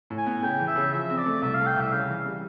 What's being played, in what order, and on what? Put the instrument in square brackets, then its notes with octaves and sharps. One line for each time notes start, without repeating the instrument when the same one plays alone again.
[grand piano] A2
[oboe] G#5
[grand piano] B3
[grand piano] C#3 [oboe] G5
[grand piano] E3
[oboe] E5
[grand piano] C#3
[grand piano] F3 [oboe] E5
[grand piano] C4
[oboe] D5
[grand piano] A3
[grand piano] C2 [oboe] E5
[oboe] F5
[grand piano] A3
[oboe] G5
[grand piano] C2 [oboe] E5
[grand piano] C#3 [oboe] F5
[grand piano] E3
G3